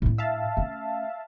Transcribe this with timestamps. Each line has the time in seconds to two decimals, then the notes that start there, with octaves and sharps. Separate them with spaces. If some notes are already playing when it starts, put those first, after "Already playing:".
0.02 A2 D4
0.18 E5 F5 A5
0.57 A3 C#4